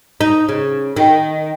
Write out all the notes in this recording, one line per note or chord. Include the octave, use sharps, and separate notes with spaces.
D#4
C#3
D#3